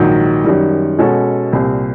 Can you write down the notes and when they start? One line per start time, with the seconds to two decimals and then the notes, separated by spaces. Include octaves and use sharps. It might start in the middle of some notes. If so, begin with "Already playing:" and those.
Already playing: A#1 G#2 D#3 F#3
0.44 F#2 D#3 G3
0.98 B2 G#3 C#4 F#4 A4
1.52 C2 A#2 G3 C4